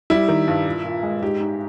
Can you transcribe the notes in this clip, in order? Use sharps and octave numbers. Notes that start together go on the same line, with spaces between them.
G3 E4
D#3
G2
A#2
A#2
G#3
G#2 G4
G#2